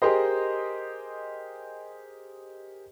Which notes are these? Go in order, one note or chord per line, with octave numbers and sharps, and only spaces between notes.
G4 G#4 A#4 C5 D#5